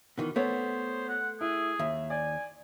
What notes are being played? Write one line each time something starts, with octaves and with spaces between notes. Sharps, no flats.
B2 D#3 E3
A3 B3 C5 C#5
F#5
E4 G#4
D#2 E5
D5 G#5